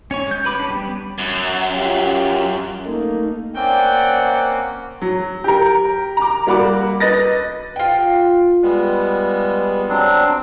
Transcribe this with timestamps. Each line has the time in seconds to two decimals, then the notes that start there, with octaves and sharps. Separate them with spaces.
0.11 C#4 C#5 C#6
0.27 G#3 G6
0.44 F#3 B4 B5 D6
0.59 C#4 D4
0.70 G3 B3
1.18 F#2
1.73 C#4 F4 G4
2.85 A3 A#3 D#4
3.55 A#3 C4 C#4 D5 F#5 G5
5.01 F#3
5.44 G4 A#4
6.17 A#5 D6
6.47 G3 A#3 F#4 B5 D6
7.00 B4 D#5 A6 A#6
7.76 F4 G5
8.63 G3 G#3 B3
9.89 F#3 C4 D4